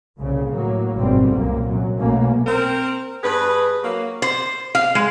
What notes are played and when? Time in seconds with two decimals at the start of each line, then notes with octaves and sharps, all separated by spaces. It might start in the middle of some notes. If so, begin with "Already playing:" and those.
0.18 C2 A#2 C#3
0.54 A2 F#3 A#3
0.96 G#1 F#2 B2 D3 G3 C4
1.34 C2 F#2 A#2 A#3
1.66 F#2 F#3
1.98 B1 F#2 B2 A3 A#3 C#4
2.46 C4 A#4
3.22 G2 G#4 B4
3.83 F#3 A#3
4.22 C5
4.75 F5
4.95 G#3